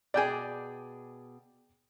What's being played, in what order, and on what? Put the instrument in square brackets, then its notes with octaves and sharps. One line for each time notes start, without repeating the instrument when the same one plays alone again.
[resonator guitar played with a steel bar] B2 G#4 [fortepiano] D5 G5 G#5